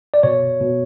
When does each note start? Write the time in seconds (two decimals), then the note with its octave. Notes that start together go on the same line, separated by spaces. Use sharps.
0.14 D5
0.23 B2 C#5
0.61 B2